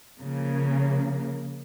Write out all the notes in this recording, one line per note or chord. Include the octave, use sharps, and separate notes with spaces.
C#3 F3 A#3